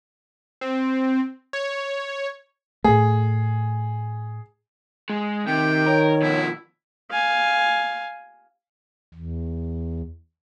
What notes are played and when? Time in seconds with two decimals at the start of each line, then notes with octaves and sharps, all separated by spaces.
0.61 C4
1.53 C#5
2.84 A2 A3 G#4
5.10 G#3
5.47 C3 D#3 G5
5.86 A#4 C#5
6.22 B2 F3 E4
7.11 F5 G#5
9.14 E2